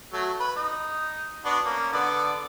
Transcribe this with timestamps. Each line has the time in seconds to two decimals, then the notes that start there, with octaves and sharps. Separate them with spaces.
0.13 F#3 A3
0.40 B4
0.56 D#4
1.45 B3 D4 F#4
1.65 A#3 C#4
1.92 D3 B3 D5